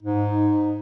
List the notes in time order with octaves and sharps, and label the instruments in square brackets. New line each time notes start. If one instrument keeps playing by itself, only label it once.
[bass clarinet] G#2 [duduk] D#4